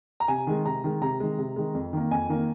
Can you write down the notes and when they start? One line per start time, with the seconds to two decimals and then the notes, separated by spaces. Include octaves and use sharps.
0.20 A#5
0.28 C3 G#5
0.47 D#3 G#3
0.65 C3 A#5
0.84 D#3 G#3
1.02 C3 A#5
1.20 D#3 G#3
1.38 C3
1.56 D#3 G#3
1.74 F2
1.93 D#3 A#3
2.11 F2 G#5
2.29 D#3 A#3